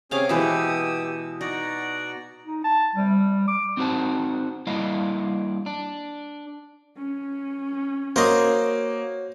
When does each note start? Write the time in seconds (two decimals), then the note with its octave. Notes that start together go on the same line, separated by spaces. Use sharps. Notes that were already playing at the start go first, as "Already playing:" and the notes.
0.11 C3 C#4 G#4 F5 D6
0.29 B2 E3 G#3 G4 D#6 E6
1.41 D#4 F#4 D5 A#5
2.44 D#4
2.64 A5
2.95 G3
3.48 D6
3.77 C4 D#4 F#4 C5 A5
4.67 G3 A#3 D4 E4 D#5 F5
5.66 D4
6.96 C#4
8.16 A#3 F#4 C5 C#5 D#5